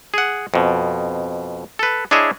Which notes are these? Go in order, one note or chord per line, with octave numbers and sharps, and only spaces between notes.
G#4 F#5
F2 B2
A4 B4
D4 E4 G#4 C#5 D#5 E5